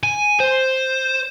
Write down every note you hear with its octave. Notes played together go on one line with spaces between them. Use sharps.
G#5
C5